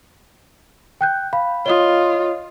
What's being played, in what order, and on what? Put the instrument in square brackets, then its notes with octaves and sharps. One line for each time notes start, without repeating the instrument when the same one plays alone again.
[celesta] G5 F#6 G6
[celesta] F5 [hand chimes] B5
[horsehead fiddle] F4 [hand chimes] C#5 D#5 D#6 [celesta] G7